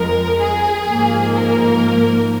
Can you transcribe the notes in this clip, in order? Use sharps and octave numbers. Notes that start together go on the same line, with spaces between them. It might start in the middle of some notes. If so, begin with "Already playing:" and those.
Already playing: F2 F3 G#3 A#4
G#4
G#2 F3 A#3
A#4